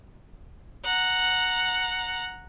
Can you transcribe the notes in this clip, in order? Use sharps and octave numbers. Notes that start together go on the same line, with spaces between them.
F#5 A#5